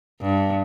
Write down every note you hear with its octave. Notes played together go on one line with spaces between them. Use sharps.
G2